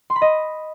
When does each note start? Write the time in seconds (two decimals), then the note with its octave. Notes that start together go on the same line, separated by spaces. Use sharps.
0.10 C6
0.16 B5
0.22 D#5